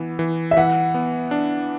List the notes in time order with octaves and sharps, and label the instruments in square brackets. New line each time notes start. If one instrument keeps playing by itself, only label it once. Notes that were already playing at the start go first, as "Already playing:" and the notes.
Already playing: [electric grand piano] E3 B3
E3
[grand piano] E5
[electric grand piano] E3 [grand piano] F#5
[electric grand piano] B3
D4